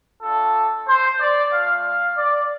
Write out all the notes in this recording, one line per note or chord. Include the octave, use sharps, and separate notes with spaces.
A3 D4 F4 A4
C5
D5
A3 F4 F5
F5
D5